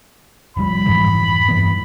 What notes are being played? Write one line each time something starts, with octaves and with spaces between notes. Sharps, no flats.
F1 F2 G3 B5
F2 G#2 E3
G2 E3 B3